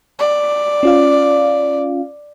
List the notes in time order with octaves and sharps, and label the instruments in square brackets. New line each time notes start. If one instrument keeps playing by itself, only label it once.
[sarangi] D5
[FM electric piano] C#4 F4 F5